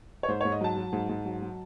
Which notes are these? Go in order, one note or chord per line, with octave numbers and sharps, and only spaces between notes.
C#5
G#2 C5
G#2 C#5
D#5
F#3 A5
F#3
G#2
G#2
F#3
F#3